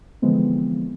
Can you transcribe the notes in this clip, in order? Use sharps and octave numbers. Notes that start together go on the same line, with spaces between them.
D3 E3 F3 G#3 B3 C4